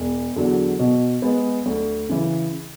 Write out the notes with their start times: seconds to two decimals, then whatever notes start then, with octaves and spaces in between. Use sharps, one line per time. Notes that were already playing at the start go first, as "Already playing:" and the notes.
Already playing: E1
0.36 E2 D3 F#3
0.79 B2
1.22 G#3 B3
1.66 D2
2.09 C#3 E3